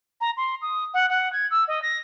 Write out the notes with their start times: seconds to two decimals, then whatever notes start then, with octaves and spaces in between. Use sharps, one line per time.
0.21 A#5
0.37 C6
0.62 D#6
0.94 F#5
1.09 F#5
1.33 G#6
1.51 E6
1.68 D#5
1.82 A#6